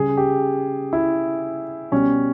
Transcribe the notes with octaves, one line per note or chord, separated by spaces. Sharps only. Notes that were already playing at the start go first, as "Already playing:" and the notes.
Already playing: C#3 G3 G#4
G4
E4
B2 G3 C#4